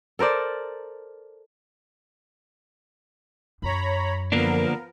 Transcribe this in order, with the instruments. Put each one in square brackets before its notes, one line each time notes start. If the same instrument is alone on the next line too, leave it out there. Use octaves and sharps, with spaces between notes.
[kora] A4 A#4 C5 D5
[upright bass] F#2 [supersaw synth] C#5 A#5 B5
[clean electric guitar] D3 A#3 D4 [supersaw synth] F3 B3 A#4